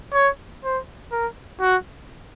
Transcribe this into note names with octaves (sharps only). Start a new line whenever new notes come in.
C#5
C5
A#4
F#4